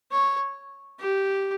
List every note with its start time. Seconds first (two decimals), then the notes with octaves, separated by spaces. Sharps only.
0.11 C#5
0.99 G4